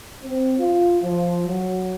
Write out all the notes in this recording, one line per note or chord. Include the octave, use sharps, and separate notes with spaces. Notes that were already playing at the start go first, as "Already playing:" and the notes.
C4
F4
F3
F#3